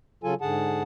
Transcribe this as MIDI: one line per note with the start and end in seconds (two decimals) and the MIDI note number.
0.24 0.34 49
0.24 0.34 54
0.24 0.34 65
0.24 0.34 69
0.24 0.34 80
0.41 0.83 44
0.41 0.83 50
0.41 0.83 68
0.41 0.83 78
0.41 0.83 81